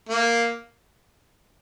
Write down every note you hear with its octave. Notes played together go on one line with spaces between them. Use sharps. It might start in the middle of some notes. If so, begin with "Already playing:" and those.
A#3